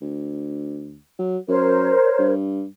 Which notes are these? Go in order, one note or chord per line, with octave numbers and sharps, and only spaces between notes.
D2
F#3
F#2 A#4 C5 C#5
G2